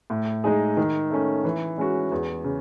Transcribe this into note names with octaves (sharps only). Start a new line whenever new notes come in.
A2
G#3 D#4 G#4
D#3
A3 C#4
E3
G#3 C#4 F#4
E2
C#3